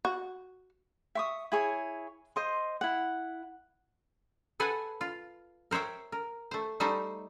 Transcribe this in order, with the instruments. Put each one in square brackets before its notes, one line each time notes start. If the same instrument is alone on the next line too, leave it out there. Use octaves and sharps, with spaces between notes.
[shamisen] F#4
[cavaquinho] E5 C#6 D#6
E4 G#4 C#5
C5 D#5 C6
E4 F#5
[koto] A4 B4 C5 F#5 G#5
F4
A#4 C5 C#5 E5 G5
A#4
A3 C5
G3 A3 D#4 C5 E5